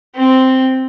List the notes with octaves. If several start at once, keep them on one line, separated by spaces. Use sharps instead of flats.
C4